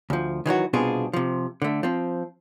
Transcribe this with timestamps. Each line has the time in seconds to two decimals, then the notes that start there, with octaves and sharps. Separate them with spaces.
0.10 D2 F3
0.46 D#3 E3 F#3 F#4
0.73 C2 B2 C4 D4 F4 G#4
1.13 C3 F3
1.62 D3 A3
1.83 F3 C4